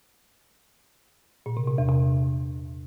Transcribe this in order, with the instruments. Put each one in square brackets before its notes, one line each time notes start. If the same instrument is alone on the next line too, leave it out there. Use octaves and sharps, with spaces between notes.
[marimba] A#2
C3
C3
E2
C3